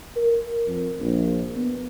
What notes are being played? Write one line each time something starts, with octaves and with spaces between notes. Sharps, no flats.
A#4
F2
A#1
B3